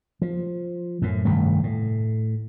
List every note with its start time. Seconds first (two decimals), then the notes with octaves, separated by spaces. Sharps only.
0.22 F3
1.02 F#2 A2
1.25 F1 G2 D#3 A3
1.64 A2